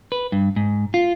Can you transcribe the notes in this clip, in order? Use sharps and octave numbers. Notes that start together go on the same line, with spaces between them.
B4
G2
G#2
F4